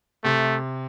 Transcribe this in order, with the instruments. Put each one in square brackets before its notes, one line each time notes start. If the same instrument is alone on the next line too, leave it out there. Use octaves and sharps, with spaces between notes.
[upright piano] C3 [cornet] A3